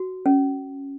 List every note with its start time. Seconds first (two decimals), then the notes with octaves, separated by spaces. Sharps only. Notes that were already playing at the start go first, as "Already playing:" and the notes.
Already playing: F#4
0.26 C#4